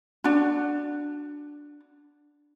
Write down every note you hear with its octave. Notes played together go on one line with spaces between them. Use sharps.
D4 F#4